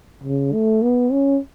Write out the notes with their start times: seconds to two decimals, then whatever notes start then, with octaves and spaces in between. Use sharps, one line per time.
0.23 C#3
0.53 A3
0.82 B3
1.12 C#4